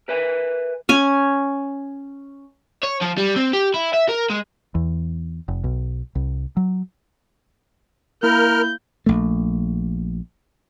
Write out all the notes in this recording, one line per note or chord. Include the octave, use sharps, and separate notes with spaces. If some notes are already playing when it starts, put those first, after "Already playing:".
A#4 B4 E5 G#5
C#4 G#5
C#5
F3
G3
C4
G4
E4
E5
A#4
G#3
E2
F1
B1
C2
F#3
A#3 E4 A#4 B5 F6 G6
A#1 A3